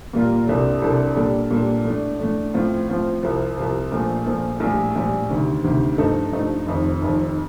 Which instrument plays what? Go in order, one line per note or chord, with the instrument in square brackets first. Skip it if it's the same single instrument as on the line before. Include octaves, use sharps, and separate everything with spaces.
[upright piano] A#2 G3 A#3 F4
C2 C3 G3 D4 A4
C2 C3 G3 D4 A4
A#2 G3 D4 A4
A#2 G3 D4 A4
A2 A3 D4
A2 A3 D4
A2 F3 C4 F4
A2 F3 C4 F4
C2 C3 F3
C2 C3 F3
A#1 A#2 F3 A3
A#1 A#2 F3 A3
A#1 A2 G3
A#1 A2 G3
D2 C3 D#3
D2 C3 D#3
G2 F3 A3 D#4 A4
G2 F3 A3 D#4 A4
F1 F2 D#3
F1 F2 D#3